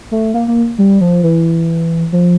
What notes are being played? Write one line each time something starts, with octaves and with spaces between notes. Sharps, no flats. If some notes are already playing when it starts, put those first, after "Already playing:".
A3
A#3
A#3
G3
F3
E3
F3